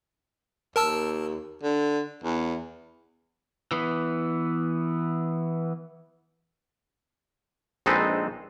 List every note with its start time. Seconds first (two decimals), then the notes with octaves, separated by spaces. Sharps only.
0.76 D#2 A#4 A5 E6
1.63 D3
2.24 E2
3.71 E3 B3
7.86 A#1 G#3 C4 D#4 A4 B4